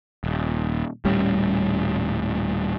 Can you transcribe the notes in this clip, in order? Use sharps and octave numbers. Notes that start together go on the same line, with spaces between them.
D#1
D#1 A2 G3 C#4